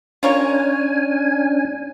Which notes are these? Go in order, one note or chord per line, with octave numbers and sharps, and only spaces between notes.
C#4 D4 F4 A#4 C#5 G#5